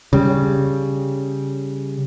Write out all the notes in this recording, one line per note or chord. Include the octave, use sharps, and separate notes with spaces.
C#3 G3